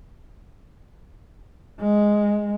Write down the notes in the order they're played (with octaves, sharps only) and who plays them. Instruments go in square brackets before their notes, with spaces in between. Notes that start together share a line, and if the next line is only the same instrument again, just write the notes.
[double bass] G#3